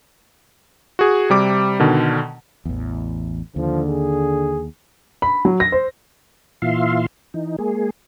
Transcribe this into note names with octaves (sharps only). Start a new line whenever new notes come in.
F#4 G#4
C3 G3 D6
B2 D3 D#3
A1 E2
D#2 D3 F3
G#4
B5
F#3
A#6
C5
A#2 E3 F4 E5 F5 C6
E3 D#4
G#3 A#3 G#4